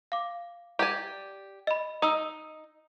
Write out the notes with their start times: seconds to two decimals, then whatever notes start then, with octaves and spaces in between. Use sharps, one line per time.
0.12 F5 D6
0.79 G4 D5 G#5
1.67 D#5 B5
2.02 D#4 D#6 E6